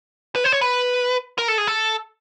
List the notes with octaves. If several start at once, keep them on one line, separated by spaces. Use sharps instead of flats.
B4
C5
C#5
B4
A#4
A4
G#4
A4